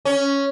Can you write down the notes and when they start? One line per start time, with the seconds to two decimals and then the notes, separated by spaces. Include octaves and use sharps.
0.05 C#4